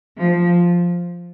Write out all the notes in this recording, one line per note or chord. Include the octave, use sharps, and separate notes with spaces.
F3